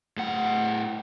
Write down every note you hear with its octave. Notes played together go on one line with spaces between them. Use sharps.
A2 F#5